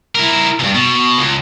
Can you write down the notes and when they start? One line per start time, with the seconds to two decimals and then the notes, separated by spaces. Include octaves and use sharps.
0.15 E4 A#4
0.60 C#2 G2
0.75 B2
1.18 C#2